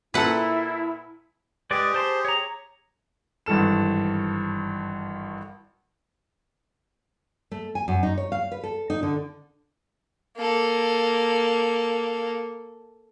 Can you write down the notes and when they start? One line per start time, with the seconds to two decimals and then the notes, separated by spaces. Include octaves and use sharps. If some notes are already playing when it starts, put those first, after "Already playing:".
0.14 A#2 E4 A4 B4 F#5
1.71 G#3 G4 G#4 B4 D5
1.94 C5 A5 C6
2.25 C#5 A#5
3.46 G#1 G2 E3 A4 E7
7.51 A3
7.75 G#5
7.88 F#2
8.03 D#4
8.18 C#5
8.32 F5
8.52 B4
8.64 A4
8.90 D#4
9.03 D3
10.37 A#3 A4